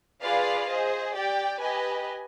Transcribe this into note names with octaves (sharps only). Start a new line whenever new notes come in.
F4 G#4 B4 D5 F5
G#4 C5 D#5
G4 D5 G5
G4 B4 D#5 G#5